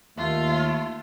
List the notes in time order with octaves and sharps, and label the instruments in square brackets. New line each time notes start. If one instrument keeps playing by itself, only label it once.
[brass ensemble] D#2 [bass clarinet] A3 [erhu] F4